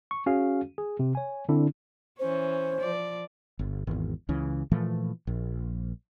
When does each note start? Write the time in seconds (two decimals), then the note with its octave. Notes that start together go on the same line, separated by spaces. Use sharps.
0.11 C#6
0.26 C#4 F#4 G#4 F5
0.78 G#4
0.99 C3
1.15 C#5 G#5
1.49 D3 C4 D4 E4
2.19 E3 C#4 C5
2.80 F3 D5
3.59 G1
3.87 G#1 E2
4.29 C#2 C#3 E3
4.72 A#2 E3 F3 A3
5.27 A#1